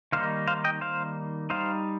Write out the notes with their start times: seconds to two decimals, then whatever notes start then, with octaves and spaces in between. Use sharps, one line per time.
0.12 D#3 G3 A#3 D#4 C5 F5
0.47 C5 F5
0.64 D#5 G5
0.81 C5 F5
1.50 G3 D#4 C5 F5